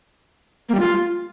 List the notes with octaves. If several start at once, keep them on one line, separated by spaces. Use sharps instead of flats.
A#3
G3
F4